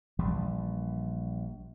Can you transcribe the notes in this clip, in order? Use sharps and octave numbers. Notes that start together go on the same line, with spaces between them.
A#1 E3 G3